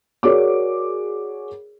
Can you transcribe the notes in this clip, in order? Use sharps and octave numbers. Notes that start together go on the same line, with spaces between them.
F#4 G#4 A#4 C#5 D5 D6